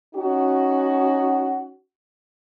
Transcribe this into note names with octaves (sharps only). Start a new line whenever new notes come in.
C#4 D#4 F#4